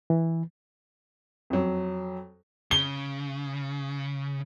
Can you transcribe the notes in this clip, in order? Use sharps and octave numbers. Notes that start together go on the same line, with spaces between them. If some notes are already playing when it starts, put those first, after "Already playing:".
E3
F2 F#3
C#3 G7